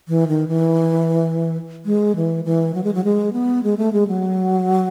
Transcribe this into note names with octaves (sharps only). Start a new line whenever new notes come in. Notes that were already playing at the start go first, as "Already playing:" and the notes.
E3
D#3
E3
G#3
E3
E3
F#3
G#3
F#3
G#3
B3
G#3
A3
G#3
F#3